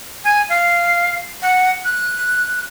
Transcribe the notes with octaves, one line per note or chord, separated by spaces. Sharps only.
G#5
F5
F#5
F#6